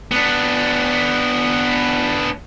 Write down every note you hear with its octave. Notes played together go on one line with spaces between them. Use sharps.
B3 D4